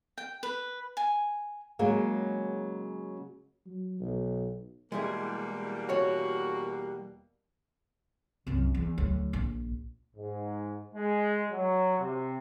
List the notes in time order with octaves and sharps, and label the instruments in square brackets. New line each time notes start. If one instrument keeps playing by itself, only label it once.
[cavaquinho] G5
B4
G#5
[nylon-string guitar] C#3 F#3 G#3 A#3
[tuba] F#3
B1
[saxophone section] E2 B2 A#3 [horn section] G3 [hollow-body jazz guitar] G#3 E4 G#4
[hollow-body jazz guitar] G3 C#5 [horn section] F#4
[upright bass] C2 F#2
E2
D2 F#3
A#1
[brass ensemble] G#2
G#3
F#3
C3